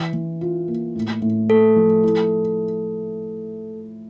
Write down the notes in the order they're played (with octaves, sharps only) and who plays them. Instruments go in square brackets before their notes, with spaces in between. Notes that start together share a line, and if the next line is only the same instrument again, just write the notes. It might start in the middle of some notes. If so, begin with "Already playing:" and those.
Already playing: [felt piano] E3
E3
F4
A#3
A2
A2
[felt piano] A3 [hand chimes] A4
[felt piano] F3
E4